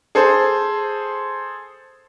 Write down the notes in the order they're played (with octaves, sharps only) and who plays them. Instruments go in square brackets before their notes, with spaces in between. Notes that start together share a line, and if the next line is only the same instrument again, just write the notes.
[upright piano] G#4 A4 C5